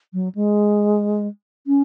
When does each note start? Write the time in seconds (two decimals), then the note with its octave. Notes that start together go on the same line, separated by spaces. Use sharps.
0.13 F#3
0.35 G#3
1.67 C#4